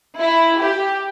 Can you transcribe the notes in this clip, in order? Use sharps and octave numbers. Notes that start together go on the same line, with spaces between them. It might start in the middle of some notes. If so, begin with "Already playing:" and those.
E4
G4